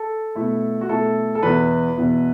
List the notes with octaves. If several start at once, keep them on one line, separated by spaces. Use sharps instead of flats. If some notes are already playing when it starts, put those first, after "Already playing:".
Already playing: A4
B2 A3 E4
F#4
B2 A3 E4 A4
A4
E2 B2 B3 E4 B4
E2 B2 B3 E4